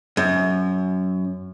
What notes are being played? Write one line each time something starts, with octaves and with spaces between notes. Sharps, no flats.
F#2